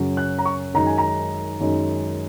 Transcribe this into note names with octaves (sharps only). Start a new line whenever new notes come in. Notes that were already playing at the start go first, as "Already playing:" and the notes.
Already playing: F#2 C#3 F#3 C#4
F#6
A#5
C#6
F#2 D#3 G#3 D#4 A#5
G#5
A#5
F#2 D#3 G#3 D#4